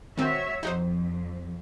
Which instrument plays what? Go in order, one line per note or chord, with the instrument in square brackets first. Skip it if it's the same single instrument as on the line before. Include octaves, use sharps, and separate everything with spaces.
[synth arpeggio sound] D#3 C4 [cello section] F#4 C#5 E5
[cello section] F2 [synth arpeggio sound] D#4 F#4 C5